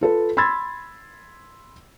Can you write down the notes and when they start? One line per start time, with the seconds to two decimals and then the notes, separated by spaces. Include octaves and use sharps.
0.01 F4 A4 B4
0.37 B5 C6 E6 G#6 A6